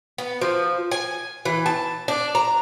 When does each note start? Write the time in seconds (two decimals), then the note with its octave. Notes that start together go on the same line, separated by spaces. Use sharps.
0.18 B3
0.41 F3
0.91 G#5
1.45 E3
1.66 A5
2.08 D4
2.35 A#5